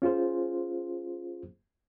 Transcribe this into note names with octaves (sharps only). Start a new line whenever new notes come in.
C#4 F4 G#4 C5